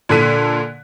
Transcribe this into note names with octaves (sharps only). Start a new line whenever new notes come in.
A#2 D3 A4 F#6 B6 D#7